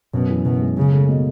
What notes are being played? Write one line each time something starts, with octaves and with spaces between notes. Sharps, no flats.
F#2 B2
E3
F#2 B2
G#3
C#3 G#4
A3
B2